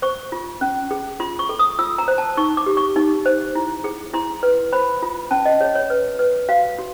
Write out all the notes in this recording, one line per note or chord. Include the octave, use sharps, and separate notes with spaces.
C5 C#6
F4
C#4
G#4
F4 C6
C#6
A4
D#6
F4 E6
A#5
C5
A5
D#4 C#6
D6
G4
C#6
D#4
C5
E4
G#4
E4 C6
B4
C5 B5
F4
C#4 A5
D#5
G#4 C#5
C#5
B4
B4
F#4 F5
F#4